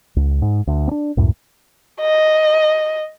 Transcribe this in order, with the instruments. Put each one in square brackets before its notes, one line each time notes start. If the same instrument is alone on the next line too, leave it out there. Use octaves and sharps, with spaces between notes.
[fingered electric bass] C#2
G#2
D2
C4 D4
C#2 F#2 A2
[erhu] D#5